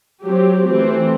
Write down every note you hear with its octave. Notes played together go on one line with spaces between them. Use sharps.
F#3 C4 G4
E3 A3 C4